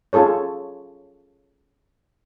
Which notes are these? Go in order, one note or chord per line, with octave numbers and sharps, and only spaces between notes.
C#4 F4 G#4 A4 C#5